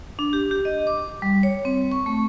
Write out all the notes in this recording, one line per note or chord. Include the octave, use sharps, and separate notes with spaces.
D4
G4
G4
D#5
D6
G3
C#5
C4
C#6
A3